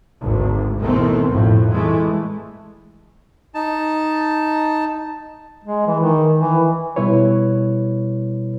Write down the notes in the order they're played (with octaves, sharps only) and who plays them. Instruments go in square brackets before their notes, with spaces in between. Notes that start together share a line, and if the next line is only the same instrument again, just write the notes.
[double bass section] G#1 D2
B2 D#3 E3 A3 C4
G#1 F2 A2
E3 G#3 A3
[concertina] D#4 A5
[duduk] G#3
E3
D#3
E3
[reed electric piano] B2 G3 E4 B4 C#5